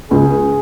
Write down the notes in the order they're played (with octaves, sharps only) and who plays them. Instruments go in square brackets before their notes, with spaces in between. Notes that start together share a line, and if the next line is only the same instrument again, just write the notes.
[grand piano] C#2 [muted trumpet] G#4